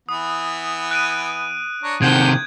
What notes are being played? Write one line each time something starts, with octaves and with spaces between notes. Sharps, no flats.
E3 B3 D#6
F#6 D7 D#7
D4 C#5 A#5
C3 D#3 F#5 G5 A5 G6 G#6